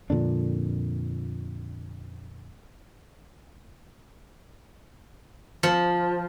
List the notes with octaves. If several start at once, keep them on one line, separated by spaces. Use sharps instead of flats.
F2 A#2 D3 D4
F3